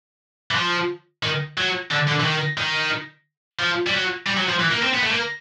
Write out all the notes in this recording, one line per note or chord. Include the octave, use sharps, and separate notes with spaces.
E3
F3
D#3
F#3
D3
D3
E3
D#3
D#3
F3
G3
F#3
G3
F#3
F3
E3
A#3
C4
B3
A3
A#3